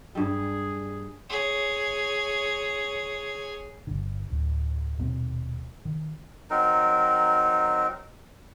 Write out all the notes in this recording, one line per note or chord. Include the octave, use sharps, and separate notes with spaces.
G2 G3 G#4
G#4 C#5
G1 D3
D1
D#1 B2 C4
D#3
F#3 C4 D#4 A#4